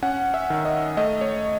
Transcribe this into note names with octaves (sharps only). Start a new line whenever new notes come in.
C#4 F#5
E5
D#3
D#5
A3 D#5
C#5